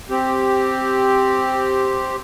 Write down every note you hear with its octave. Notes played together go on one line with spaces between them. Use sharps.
C4 G4